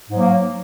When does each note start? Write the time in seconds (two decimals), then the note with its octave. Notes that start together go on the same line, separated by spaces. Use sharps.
0.09 G#2
0.13 F#3
0.17 A#3